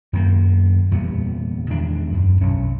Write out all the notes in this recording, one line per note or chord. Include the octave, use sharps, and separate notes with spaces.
F#2 D#3 A#3
E2 A#2 G3 B3
E2 D#3 G#3 D4
F#2
B1 C#4